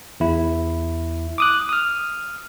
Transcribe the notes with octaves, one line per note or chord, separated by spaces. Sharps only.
E2 E4
D6 D#6 F#6
D#6 F6